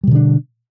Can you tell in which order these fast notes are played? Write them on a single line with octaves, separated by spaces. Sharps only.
G3 B2 D3 D4